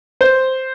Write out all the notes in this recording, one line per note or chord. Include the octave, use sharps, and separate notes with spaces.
C5